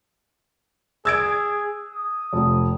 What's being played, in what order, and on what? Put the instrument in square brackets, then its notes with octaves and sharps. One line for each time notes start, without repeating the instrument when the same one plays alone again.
[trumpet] G#4 [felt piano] E6 G#6 D7
[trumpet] D#6
[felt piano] F1